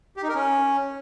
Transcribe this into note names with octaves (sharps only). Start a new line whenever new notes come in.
G4
D#4
A#4
C#4